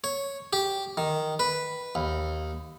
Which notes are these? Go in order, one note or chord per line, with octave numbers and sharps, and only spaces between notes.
C#5
G4
D#3
B4
D#2